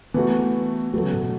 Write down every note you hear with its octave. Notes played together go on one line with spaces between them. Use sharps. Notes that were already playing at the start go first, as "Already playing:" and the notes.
E3 A3 B3 F#4
F#3 A3 B3 A4
C#3
A2
B2